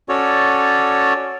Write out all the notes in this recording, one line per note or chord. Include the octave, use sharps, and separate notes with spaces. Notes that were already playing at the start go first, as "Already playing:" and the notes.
C#4 F#4 A4 C#5 D5